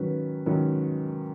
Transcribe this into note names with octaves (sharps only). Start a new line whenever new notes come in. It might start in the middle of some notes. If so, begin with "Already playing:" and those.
Already playing: G#2 D#3 F#3 C#4 B4
G#2 D#3 F#3 C#4